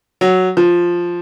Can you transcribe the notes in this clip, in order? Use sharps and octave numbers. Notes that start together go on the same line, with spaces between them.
F#3
F3